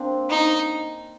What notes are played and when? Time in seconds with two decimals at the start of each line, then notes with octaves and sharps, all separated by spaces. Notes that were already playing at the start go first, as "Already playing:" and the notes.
Already playing: A#3 C4 D4
0.29 D#4